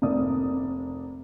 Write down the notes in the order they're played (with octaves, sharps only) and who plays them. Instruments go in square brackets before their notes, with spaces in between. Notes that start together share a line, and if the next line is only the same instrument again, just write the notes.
[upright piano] F1 C3 A#3 D5 D#6